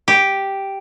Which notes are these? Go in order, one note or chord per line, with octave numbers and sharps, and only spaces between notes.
G4